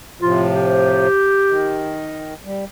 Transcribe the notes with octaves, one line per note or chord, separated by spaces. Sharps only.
A2 C3 F3 F4
G4
D#3
G3